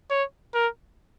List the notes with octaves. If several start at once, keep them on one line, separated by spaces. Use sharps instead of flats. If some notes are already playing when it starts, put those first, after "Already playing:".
C#5
A#4